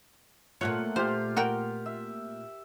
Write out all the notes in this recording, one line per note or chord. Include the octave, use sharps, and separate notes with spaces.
A#2 A3 C4 F4 C#5 F#5
F4 G4 C5 F5
F#4 A#4 G5
E5